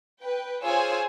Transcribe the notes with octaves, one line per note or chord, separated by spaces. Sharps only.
B4 G5
F4 G#4 C5 C#5 G#5 E6